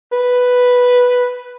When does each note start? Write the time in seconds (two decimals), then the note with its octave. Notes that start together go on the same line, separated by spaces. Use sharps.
0.12 B4